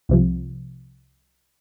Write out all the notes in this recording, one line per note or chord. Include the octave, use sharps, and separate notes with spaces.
C2 C3 F3